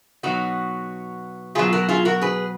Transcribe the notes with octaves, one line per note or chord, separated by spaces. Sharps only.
B2 F#3 D#4 F#4
B2 F#3 F4 G#4
F#4 A#4
F4 G#4
F#4 A#4
G#4 B4